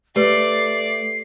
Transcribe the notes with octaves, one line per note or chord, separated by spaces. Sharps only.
A3 G4 B4 D5 C7